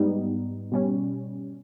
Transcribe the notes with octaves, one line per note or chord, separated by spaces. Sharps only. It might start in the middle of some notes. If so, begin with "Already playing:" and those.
Already playing: G#2 G3 B3 D#4
B2 G3 C#4